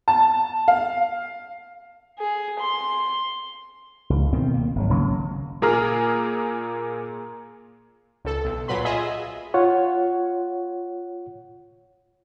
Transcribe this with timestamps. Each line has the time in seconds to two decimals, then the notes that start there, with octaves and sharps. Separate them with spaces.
0.08 A5
0.68 F5
2.20 G#4
2.61 C6
4.10 C#2
4.33 B2 D#3 C4
4.54 A#3
4.76 G#1 F#3
4.90 G#1 C#3 F#3 A#3
5.62 A#2 A#3 G#4 A#5 F6
8.25 C#2 A4
8.45 B1
8.68 A#2 F#3 B4 B5 C6
8.85 F4 G#4 D#5 E5
9.54 F4 C#5 F#5